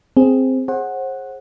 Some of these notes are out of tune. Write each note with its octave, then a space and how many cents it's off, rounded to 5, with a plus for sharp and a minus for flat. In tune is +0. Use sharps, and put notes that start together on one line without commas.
C4 +0 G#4 +0
G#4 +0 C5 +40 F#5 +0